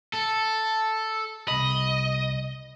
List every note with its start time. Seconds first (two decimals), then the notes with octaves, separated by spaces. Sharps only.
0.14 A4
1.48 C2 D#5 B5